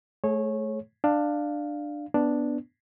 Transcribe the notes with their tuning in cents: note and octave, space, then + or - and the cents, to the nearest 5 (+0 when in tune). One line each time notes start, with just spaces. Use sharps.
A3 -20 G#4 +25 C#5 -20
D4 +15 F5 +0
B3 +0 D4 +0